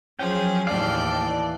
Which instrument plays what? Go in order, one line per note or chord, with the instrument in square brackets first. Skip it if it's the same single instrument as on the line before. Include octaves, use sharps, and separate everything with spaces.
[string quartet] F3 F#3 G#4 [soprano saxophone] C#4 [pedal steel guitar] G5
[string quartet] D#2 A2 G5 [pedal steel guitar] E3 F5 [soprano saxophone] D5 [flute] A5